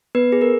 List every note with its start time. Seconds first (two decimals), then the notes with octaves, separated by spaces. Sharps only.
0.15 B3 B4
0.32 G#4
0.41 A#4